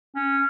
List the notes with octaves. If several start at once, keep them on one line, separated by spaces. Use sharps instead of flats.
C#4